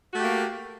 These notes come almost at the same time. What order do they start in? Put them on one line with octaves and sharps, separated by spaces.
F#4 A3 G4 A#3